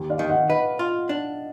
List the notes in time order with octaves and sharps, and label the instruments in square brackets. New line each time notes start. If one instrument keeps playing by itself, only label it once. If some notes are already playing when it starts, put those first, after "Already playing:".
Already playing: [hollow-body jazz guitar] D#2
[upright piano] D5 F5
[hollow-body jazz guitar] D#3
[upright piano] D#5 F#5
[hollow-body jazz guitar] B4 [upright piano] D#5 F#5
[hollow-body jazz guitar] F4
D4